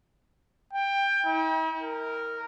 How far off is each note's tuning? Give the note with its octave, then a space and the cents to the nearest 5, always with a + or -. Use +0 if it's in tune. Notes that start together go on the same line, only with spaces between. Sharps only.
G5 +20
E4 -45
A#4 -10